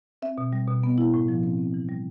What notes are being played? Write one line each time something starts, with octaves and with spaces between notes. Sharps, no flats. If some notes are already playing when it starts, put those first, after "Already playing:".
C4 E5
B2
G3
B2
B3
E4
A2
F3
C4
C4
E3
G3